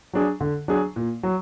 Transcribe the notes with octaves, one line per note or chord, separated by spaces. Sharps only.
F#3 D4 G#4
D3
F#3 D4 G#4
A#2
F#3